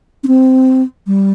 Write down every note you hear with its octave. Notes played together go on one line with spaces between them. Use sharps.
C#4
C4
G3